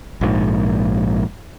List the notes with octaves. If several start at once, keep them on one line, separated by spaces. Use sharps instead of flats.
A#1 G#2